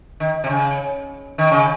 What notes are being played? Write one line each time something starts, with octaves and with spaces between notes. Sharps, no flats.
D#3
C3
C#3
D#3
C#3